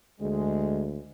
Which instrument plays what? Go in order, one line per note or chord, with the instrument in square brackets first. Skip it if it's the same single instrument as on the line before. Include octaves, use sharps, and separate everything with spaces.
[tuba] D2 [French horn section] G#3